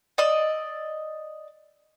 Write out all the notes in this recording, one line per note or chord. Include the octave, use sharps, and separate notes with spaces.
D5 D#5 E6